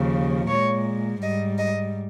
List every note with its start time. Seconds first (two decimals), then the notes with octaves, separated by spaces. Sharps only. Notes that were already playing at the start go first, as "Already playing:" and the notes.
Already playing: D#2 C#3 F3
0.48 A#2 G#3 C#5
1.22 G#2 G3 D#5
1.58 D#5